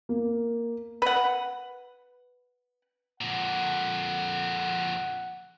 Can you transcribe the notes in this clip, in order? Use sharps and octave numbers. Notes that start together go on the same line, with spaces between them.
A#3
B4 F#5
F2 A#2 F#5